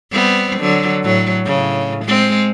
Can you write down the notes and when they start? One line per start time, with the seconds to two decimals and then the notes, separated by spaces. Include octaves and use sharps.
0.12 G3 B3 C4
0.60 D3 F#3
1.04 A2 F#3
1.45 A2 C#3
2.05 G#3 C4